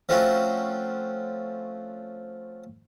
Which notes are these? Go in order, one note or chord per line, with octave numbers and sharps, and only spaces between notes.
F3 A3 C4 C#4 F4 F#4